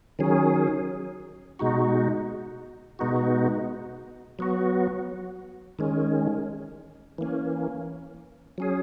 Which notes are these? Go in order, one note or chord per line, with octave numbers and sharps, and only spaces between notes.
D#3 F#3 C#4 G#4
B2 G#3 D#4 F#4
B2 G#3 B3 D#4 F#4
F#3 B3 F#4
D#3 G#3 C#4
E3 A#3 C#4
F#3 C#4 G#4